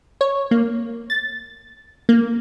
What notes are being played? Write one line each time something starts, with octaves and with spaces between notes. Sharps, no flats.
C#5
A#3
A6
A#3